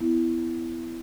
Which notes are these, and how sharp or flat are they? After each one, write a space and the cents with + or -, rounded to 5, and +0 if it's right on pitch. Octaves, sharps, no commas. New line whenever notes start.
B3 +20 E4 +10